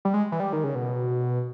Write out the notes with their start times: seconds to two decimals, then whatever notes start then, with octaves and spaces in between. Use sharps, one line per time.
0.05 G3
0.14 G#3
0.32 E3
0.40 G3
0.53 D#3
0.64 C#3
0.75 B2